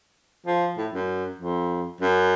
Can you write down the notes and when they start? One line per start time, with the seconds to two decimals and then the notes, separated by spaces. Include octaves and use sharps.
0.46 F3
0.77 A2
0.93 F#2
1.39 F2
2.01 F#2